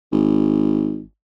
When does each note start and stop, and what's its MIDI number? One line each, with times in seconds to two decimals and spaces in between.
0.12 1.03 32